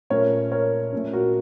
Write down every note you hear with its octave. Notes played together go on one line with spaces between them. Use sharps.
A#2 A3 C#4 A#4 C#5
A#4 C#5
A#2 A3 C#4
F#4 A#4